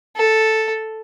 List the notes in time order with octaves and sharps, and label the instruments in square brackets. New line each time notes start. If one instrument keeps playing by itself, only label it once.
[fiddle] A4